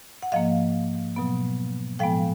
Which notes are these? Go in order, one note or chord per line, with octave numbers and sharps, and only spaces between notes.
F#5
G#2 F3 A#3 D#5 F5
B2 F#3 B3
A2 F3 G#3 B3 F5 G5